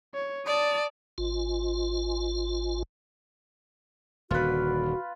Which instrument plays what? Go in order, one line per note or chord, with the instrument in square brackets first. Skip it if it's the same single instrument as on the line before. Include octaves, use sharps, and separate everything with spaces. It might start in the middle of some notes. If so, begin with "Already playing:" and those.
[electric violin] C#5
[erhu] D5 [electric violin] A5 D#6
[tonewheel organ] G#1 F4
[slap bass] D#1 D3 [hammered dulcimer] F4 B4 [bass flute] F#4